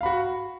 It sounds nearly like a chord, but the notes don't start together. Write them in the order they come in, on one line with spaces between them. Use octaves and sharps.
F5 B5 F#4